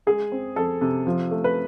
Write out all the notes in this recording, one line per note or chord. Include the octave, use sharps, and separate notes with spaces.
G#3 G#4
C4
F2 A4
C3
F3
A3
B4